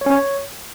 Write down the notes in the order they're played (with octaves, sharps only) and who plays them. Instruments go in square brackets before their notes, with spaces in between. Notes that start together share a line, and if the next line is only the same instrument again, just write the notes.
[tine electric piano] C#5
C#4
C#5